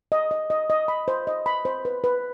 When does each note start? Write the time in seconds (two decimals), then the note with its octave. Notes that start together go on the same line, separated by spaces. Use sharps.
0.12 D#5
0.31 D#5
0.50 D#5
0.70 D#5
0.88 B5
1.08 C5
1.27 D#5
1.46 B5
1.65 C5
1.85 B4
2.04 B4